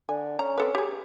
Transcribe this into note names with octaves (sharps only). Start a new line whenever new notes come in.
D3 G#5
C#4 A#5
C4 A4 B4
G4 G#4